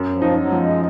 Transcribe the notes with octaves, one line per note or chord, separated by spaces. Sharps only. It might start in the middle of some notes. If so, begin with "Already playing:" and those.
Already playing: F#2
F3
D#4
F#3
F3
G#3